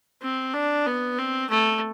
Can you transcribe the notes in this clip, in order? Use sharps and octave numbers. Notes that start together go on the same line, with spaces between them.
C4
D4
B3
C4
A3